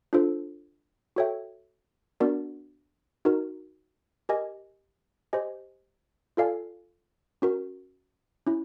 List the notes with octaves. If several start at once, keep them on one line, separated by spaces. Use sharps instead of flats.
D4 F4 A4 C5
F#4 A4 C#5 E5 G5
B3 D4 F#4 A#4 D5
D#4 F#4 A#4
G4 A#4 D#5 G#5
G4 C5 D#5 G#5
F4 A4 D5 F5 G#5
C#4 F#4 A#4
C#4 E4